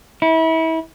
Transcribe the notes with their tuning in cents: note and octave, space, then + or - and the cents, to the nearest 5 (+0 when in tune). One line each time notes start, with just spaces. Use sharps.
E4 -30